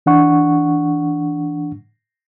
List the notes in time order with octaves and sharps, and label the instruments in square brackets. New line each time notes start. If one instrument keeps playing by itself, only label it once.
[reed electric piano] E3 D4 F#5 C#6